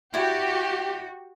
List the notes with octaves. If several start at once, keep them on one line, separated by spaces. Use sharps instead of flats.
E4 F#4 G4 D5